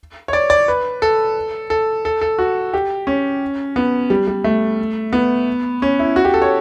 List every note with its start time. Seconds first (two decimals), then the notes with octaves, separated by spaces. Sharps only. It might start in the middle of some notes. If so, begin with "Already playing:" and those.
0.28 C#5
0.33 D5
0.50 D5
0.68 B4
1.02 A4
1.70 A4
2.05 A4
2.21 A4
2.39 F#4
2.74 G4
3.07 C#4
3.76 B3
4.10 G3
4.28 G3
4.44 A3
5.13 B3
5.82 C#4
5.99 E4
6.16 F#4
6.25 G4
6.34 A4
6.42 C#5